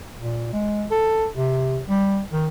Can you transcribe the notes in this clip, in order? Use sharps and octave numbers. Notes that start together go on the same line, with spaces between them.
A#2
G#3
A4
C3
G3
D#3